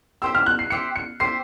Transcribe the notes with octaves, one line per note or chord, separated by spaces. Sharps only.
G4 C5 E5 E6
F6
F#6
C7
G4 C5 E5 C#7
C#7
G4 C5 E5 C7